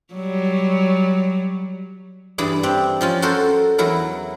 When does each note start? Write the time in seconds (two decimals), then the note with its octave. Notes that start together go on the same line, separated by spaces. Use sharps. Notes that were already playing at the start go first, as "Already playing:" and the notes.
0.14 F#3 G3
2.38 G2 E3 G#4 D5
2.63 C4 D4 G4
3.01 F3 C#4 F4
3.22 F#4 A4 A#4 C5
3.78 E2 F#3 E4 A#4